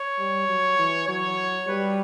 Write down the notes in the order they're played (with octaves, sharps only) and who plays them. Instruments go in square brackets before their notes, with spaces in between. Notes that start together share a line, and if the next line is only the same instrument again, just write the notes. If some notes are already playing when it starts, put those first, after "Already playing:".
Already playing: [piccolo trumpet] C#5
[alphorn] G3
F#3
E3
[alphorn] F#3 [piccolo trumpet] C#5
[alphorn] G3 [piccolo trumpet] B4